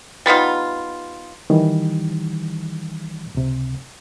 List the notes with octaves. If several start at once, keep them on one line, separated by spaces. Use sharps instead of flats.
G3 B3 D#4 F4
D#3 E3 G3
C#2 C3